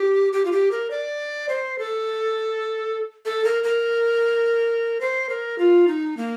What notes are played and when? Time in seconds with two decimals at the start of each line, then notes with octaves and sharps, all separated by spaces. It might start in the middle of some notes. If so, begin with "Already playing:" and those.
Already playing: G4
0.33 G4
0.45 F4
0.52 G4
0.71 A#4
0.91 D5
1.49 C5
1.79 A4
3.25 A4
3.45 A#4
3.64 A#4
5.01 C5
5.29 A#4
5.58 F4
5.88 D#4
6.17 A#3